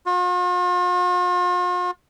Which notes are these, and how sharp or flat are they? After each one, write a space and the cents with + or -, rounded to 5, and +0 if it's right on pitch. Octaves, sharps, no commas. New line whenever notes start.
F4 +45